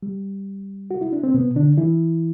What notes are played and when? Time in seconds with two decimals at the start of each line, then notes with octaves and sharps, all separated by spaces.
0.03 G3
0.91 F#4
1.01 E4
1.13 D4
1.24 C4
1.34 B2 B3
1.56 D3 D4
1.77 E3 E4